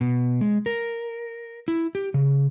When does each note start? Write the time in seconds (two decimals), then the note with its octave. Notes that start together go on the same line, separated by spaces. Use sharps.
0.01 B2
0.41 G#3
0.66 A#4
1.68 E4
1.95 G4
2.14 C#3